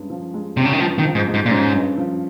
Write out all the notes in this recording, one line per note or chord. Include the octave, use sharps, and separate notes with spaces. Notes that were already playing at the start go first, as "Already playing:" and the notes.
Already playing: G2 G#3 C#4
F3
G#3
C3 C#4
C#3
D#3
G2 F3
D#3
F3
G#2
G#3
G#2
A#2
G#2 C#4
G2
F3